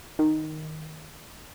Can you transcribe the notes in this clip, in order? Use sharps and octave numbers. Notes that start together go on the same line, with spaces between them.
D#3